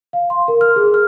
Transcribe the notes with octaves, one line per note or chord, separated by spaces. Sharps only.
F5
C6
A#4
F6
G#4
F6